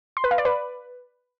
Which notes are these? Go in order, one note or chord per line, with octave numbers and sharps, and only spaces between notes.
C6
B4
F5
D5
B4